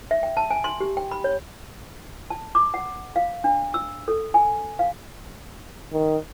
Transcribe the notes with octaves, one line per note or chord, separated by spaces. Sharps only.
E5
G5
A5
G#5
C6
G4
G5
B5
C#5
A5
D6
F#5
F5
D4
E6
A4
G#5
F5
D#3